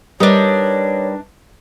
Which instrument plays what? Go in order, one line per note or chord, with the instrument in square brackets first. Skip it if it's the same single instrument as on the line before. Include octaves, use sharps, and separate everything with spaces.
[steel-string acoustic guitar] G3 A#4 B4 [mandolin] D4 D#4 [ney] C#5